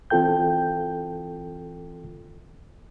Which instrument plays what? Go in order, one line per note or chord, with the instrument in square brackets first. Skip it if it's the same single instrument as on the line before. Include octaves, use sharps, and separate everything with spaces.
[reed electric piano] E3 C4 F4 A4 G5 G6